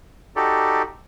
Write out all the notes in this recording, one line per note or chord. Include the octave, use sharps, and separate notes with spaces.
D#4 F#4 G4 A4 D5